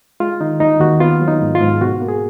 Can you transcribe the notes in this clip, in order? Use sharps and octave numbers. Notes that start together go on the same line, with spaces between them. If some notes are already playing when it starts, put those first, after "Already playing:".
G#3 F4
D#3 D#4
D#2 D#4
D#2 F#4
B3 F4
F#3
D#4
G#2
F4
G#2
B2 F#4
A#3
G#4